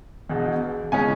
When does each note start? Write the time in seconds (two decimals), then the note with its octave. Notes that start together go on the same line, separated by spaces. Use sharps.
0.29 E1 E2 B2
0.92 C#3 G#3 C#4 G#5